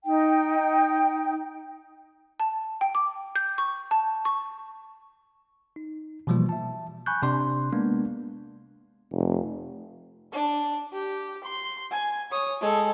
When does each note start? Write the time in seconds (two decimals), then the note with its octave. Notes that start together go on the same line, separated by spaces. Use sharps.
0.04 D#4 G5
2.40 A5
2.81 G5
2.95 D6
3.35 G6
3.58 C#6
3.91 A5
4.25 C#6
5.76 D#4
6.27 B2 E3 F3 G3 A#3 F4
6.49 E5 A5
7.06 G#5 B5 C#6 F#6 G6
7.22 C3 D4 D5 C6
7.73 G#3 A#3 B3 D4
9.12 F1
10.33 D4
10.93 G4
11.44 C6
11.91 G#5
12.31 C#5 D#6
12.61 G#3 A4